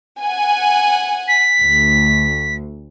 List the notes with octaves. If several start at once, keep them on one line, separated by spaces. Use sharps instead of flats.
F#5 G#5
B6
D2